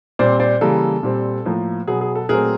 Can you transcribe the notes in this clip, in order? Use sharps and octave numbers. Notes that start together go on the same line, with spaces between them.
A#2 G3 C4 C5 D5
C5 D5
C#3 E3 G3 A#3 A4
A#2 G3 C4
A2 F3 A#3
B2 F#3 B3 G#4
G#4
A4
A#2 F#3 A3 C4 G#4 A#4